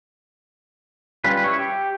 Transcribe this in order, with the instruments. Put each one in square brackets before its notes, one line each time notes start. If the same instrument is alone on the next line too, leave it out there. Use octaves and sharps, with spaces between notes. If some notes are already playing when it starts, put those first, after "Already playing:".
[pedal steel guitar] G3 C#4 F4 B4
E4 C#5
G4